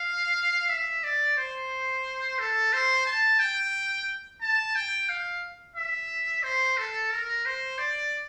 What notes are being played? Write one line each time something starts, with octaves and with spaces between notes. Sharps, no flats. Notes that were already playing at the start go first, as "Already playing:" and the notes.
Already playing: F5
E5
D5
C5
A4
C5
A5
G5
A5
G5
F5
E5
C5
A4
A#4
C5
D5